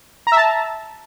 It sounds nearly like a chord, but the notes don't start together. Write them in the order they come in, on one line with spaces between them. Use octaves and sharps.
A#5 E5 A5